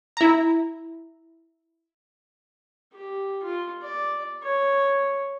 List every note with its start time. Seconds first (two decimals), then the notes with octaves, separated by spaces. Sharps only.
0.17 E4 A#5
2.93 G4
3.43 F4
3.82 D5
4.43 C#5